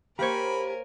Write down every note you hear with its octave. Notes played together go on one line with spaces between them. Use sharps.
A#3 G4 A#4 C5 C#5 G#5 B5